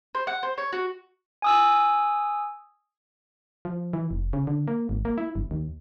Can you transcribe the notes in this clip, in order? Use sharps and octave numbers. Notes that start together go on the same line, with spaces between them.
C5
F#5
C5
C#5
F#4
G#5 D#6 E6
F3
E3
F1
C#3
D3
A#3
G#1
A#3
E4
G1
D#2